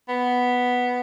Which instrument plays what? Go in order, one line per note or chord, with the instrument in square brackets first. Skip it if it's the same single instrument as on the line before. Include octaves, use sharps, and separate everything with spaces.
[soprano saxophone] B3